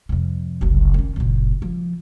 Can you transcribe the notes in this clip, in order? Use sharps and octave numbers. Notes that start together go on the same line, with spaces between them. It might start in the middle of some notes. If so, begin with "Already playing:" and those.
F2 C3
F#1 C2
D#3 C#4
F#1 A#2
F3